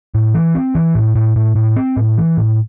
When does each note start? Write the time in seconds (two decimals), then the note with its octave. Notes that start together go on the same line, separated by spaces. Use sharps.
0.15 A2
0.34 E3
0.55 C4
0.75 E3
0.95 A2
1.15 A2
1.36 A2
1.56 A2
1.76 C4
1.96 A2
2.17 E3
2.37 A2